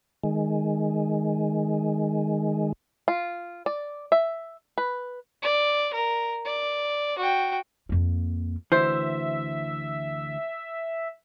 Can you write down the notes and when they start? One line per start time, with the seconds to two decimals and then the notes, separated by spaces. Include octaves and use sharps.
0.24 D#3 G#3
3.08 F4
3.66 D5
4.12 E5
4.78 B4
5.42 D5
5.93 A#4
6.45 D5
7.18 F#4 G5
7.89 F2 A#3
8.72 D2 E3 C5 E5